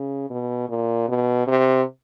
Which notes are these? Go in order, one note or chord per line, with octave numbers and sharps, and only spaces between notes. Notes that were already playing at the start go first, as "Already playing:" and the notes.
Already playing: C#3
B2
A#2
B2
C3